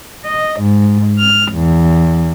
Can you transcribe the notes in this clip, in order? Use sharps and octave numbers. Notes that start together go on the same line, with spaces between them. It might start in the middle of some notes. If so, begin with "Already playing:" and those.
D#5
G#2
F6
E2